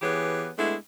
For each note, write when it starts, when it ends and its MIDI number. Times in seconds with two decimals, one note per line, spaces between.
0.01 0.49 52
0.01 0.49 59
0.01 0.49 67
0.01 0.49 68
0.01 0.49 73
0.58 0.75 56
0.58 0.75 57
0.58 0.75 59
0.58 0.75 62
0.58 0.75 64